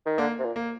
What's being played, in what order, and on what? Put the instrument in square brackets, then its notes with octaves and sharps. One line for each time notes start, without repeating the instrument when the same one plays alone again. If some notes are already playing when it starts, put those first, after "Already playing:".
[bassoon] D#3
[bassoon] D3 [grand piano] A#3
[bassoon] C3
A#2
[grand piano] A#3